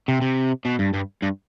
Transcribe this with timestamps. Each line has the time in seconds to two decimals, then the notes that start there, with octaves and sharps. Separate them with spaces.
0.08 C3
0.22 C3
0.65 B2
0.79 G2
0.94 G2
1.22 G2